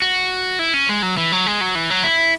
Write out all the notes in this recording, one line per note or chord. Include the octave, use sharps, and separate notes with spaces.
F#4
E4
C#4
G#3
F#3
E3
F#3
G#3
F#3
E3
F#3
E4